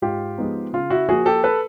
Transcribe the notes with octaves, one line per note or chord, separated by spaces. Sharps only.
G#2 F4 G4
F3 G#3 B3 D#4
C#3 F4
E4 F#4
F3 A#3 F#4 G#4
G4 A4
A4 B4